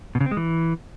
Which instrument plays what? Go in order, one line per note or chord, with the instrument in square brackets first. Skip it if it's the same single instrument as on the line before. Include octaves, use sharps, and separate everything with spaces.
[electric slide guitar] B2
C#3
C4
G#3
E3